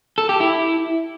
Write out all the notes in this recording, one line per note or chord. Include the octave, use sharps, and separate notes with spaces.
A4
G4
E4